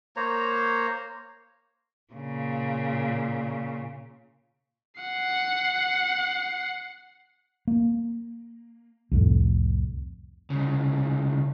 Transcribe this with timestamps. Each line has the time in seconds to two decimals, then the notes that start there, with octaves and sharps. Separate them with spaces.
0.16 A#3 C5 C#5 A#5
2.13 A#2 C#3
5.00 F#5 C7
7.67 A#3
9.11 C2 F2 A2
10.50 C2 C#3